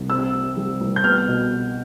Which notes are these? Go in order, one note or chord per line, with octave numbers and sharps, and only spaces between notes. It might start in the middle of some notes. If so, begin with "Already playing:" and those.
Already playing: C2
C3 E6
C3
G3
C2
G6
B3 F6
B2